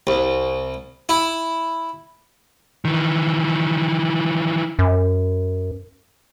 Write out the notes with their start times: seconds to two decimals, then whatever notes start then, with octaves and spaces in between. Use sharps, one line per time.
0.07 C2
1.09 E4
2.85 D#3 E3
4.79 F#2